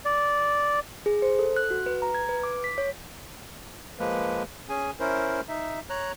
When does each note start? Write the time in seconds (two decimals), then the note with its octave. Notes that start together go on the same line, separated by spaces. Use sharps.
0.05 D5
1.06 G#4
1.22 C5
1.39 A4
1.57 F#6
1.71 F#4
1.86 B4
2.02 A#5
2.15 G#6
2.29 B4
2.43 D6
2.64 B6
2.78 C#5
3.99 F3 G#3 A#3 B4
4.69 C#4 G#4 G#5
5.00 C#4 E4 A#4 C5
5.48 D#4 E5
5.90 C#5 A#5 F#6